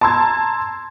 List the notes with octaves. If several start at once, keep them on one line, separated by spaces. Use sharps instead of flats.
A5 A#5 C6 E6 G#6